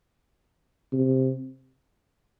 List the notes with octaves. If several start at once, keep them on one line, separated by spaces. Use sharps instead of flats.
C3